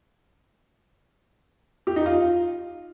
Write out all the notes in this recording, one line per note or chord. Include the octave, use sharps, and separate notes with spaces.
G4
D#4
F4